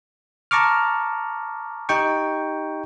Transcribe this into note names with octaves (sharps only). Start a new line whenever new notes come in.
A5 A#5 C#6 D6 F6
D#4 G4 G5 C#6